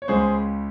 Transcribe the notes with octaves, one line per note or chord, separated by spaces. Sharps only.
C#5
C#2 C#3 G#3 G#4 C5